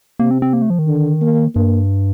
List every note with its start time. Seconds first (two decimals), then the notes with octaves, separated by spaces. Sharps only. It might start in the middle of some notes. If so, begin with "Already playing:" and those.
0.19 C3 A#3
0.31 C4
0.42 C4
0.53 A#3
0.62 A3
0.70 F3
0.79 D#3
0.88 D3
1.21 A#3
1.55 G2 A#3